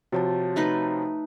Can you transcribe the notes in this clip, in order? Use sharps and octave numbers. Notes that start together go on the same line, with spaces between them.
C3 F3 F#4 C#5 A5
A3 D#4 B4